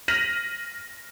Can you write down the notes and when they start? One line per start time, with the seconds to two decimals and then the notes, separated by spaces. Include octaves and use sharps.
0.08 F6 A#6 B6 D#7 F7 F#7